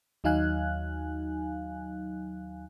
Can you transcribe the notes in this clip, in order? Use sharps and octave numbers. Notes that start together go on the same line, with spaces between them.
D#2 F#3 D#4 F5 G#5 F#6